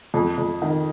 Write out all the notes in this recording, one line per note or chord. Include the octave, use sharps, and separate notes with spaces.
F2
F2
D#3